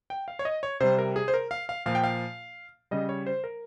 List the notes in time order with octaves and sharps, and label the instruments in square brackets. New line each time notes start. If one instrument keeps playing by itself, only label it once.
[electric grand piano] G5
F5
C#5
D#5
C#5
C3 G3 C5
A#4
G#4
C5
A#4
F5
F5
A#2 F3 F5
G5
F5
C#3 G3 D#5
C#5
C5
A#4